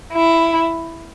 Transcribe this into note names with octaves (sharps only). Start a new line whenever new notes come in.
E4